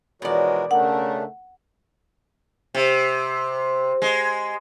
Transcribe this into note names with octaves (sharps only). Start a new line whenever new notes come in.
B2 E3 F3 G#3 F#4 A#4 C#5 D5
C#3 A3 C#4 D4 A#4 F#5
C3
G#3